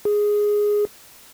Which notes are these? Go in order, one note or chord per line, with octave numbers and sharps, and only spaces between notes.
G#4